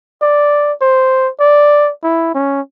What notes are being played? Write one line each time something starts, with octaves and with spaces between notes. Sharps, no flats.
D5
C5
D5
E4
C#4